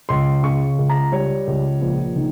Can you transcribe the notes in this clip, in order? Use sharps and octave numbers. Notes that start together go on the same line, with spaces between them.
C#2 C6
C#3 C#6
C#2
A#5
G3 C#5
C#2
A#1
D#3